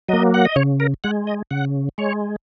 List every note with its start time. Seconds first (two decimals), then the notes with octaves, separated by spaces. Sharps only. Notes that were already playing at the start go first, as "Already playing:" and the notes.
0.08 F#3 A#3 D#5
0.34 F#5
0.45 D#5
0.56 C#3 C#5
0.80 A#4
1.04 G#3 F#5
1.27 D#5
1.51 C#3 F#5
1.98 G#3 C#5